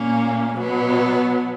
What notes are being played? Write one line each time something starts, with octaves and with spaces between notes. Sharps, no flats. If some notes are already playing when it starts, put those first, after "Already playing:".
Already playing: A#2 A#3 C#4
B2 F#3 B3